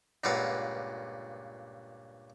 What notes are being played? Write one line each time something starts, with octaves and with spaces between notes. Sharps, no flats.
C#2 G2 A#2 B4 F5 F#5